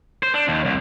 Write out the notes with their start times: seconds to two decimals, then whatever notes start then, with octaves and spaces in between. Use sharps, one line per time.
0.23 C5
0.34 D4
0.48 D#2
0.65 C2